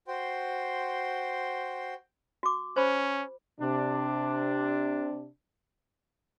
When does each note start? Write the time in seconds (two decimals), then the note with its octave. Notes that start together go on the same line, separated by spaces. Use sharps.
0.08 F#4 C5 G5 C6
2.43 F#4 D6
2.76 C#4 C5 B5
3.60 C3 D4